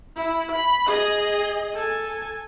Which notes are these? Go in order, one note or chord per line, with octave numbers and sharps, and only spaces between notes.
E4
B5
G#4 D#5
A4 G#5